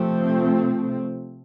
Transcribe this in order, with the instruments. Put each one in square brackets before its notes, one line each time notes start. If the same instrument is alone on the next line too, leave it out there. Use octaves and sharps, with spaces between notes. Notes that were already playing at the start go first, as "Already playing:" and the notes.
Already playing: [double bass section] C3 F3 A3 C4